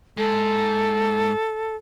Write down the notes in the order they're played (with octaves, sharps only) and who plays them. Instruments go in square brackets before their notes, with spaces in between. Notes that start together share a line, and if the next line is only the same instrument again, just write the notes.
[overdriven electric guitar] G#2 [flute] A4